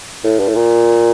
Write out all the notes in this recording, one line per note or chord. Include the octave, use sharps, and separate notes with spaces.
A2
G2
A2
A#2